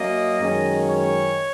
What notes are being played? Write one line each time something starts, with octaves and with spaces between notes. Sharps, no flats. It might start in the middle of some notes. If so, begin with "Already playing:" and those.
Already playing: F#2 F#3 A#3 D#5
F#2 D#3 G#3 C#4
C#5